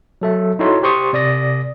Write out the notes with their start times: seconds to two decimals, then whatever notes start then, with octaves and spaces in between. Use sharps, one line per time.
0.21 F#3 A4 E5
0.59 D#4 E4 F#4 A4 C#5 C6
0.83 G4 C5 C6 C#6 D#6
1.13 C3 D5 D#6 A#6